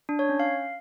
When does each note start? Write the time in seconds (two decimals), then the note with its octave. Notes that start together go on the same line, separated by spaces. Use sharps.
0.09 D4
0.19 C#5
0.29 C#4
0.40 F5